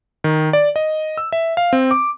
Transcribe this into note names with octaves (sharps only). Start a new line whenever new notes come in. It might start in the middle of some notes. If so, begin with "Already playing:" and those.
D#3
D5
D#5
E6
E5
F5
C4
D6